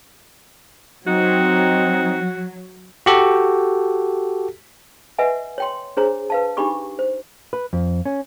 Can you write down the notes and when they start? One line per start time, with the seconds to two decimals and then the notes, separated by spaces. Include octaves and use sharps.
1.07 F#3 C4 D#4 F#4
3.06 F#4 G4 A4
5.19 B4 D#5 E5 F#5 G#5
5.58 C#5 G5 C6
5.97 D4 G#4 C5 C#5 A#5
6.30 B4 F5 A5
6.57 D4 D#4 G4 B5 C#6 D6
6.99 C5
7.53 B4
7.73 F2
8.06 C#4